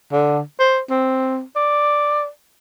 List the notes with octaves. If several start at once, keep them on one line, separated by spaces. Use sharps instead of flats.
D3
C5
C4
D5